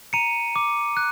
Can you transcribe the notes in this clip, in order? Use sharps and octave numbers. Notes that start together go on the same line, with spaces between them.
A#5 C#7 D#7
D6
F#6